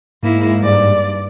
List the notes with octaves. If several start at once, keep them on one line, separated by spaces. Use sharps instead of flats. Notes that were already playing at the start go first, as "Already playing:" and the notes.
G#2 A#3 E4
G2 D5